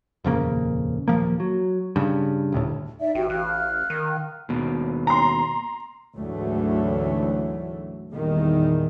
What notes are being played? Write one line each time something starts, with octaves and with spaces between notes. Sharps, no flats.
D#1 F2 C#3 A#3
D#1 C#2 F3 A#3
F#3
G2 C#3
D#1 D2 A2
D#4 D5 E5
A1 F#4 G4 G5
A1 F5 F6 F#6
D#3
D#2 B2
A#5 C6
D2 G#2 D3 E3 F#3 A3
E2 A#2 D#3 G3